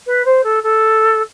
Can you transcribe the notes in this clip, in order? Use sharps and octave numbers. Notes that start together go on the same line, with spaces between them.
B4
C5
A4
A4